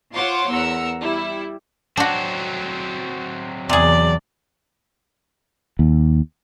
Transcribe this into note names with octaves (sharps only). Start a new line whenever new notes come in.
F4 C5 C#5 F#5 C6 D6
E2 A#4 F#5 E6
G3 E4
F#3 C4 D4 F#4
E2 C3 G#4 D5
D#2